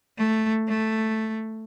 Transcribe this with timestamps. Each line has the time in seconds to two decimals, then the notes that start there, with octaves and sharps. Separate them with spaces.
0.18 A3
0.68 A3